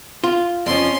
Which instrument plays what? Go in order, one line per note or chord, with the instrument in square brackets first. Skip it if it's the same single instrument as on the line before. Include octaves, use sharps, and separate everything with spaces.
[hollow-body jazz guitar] F4
[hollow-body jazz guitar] F2 F3 [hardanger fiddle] C#4 C6